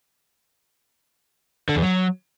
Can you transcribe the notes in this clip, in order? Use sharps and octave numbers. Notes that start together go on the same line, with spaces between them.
D3
E2
F#3